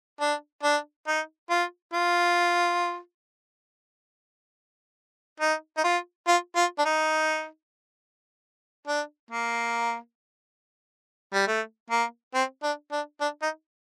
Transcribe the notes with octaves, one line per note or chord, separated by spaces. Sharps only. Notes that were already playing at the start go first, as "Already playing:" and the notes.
D4
D4
D#4
F4
F4
D#4
D#4
F4
F4
F4
D4
D#4
D4
A#3
G3
A3
A#3
C4
D4
D4
D4
D#4